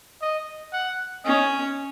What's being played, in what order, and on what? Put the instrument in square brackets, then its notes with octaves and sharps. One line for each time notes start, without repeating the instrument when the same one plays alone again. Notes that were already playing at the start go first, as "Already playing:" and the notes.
[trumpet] D#5
F#5
[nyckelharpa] C#4 [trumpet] D#5